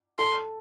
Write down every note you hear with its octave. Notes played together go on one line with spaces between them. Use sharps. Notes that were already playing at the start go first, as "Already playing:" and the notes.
A4 C6